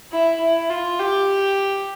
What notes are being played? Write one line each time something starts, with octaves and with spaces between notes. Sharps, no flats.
E4
E4
F4
G4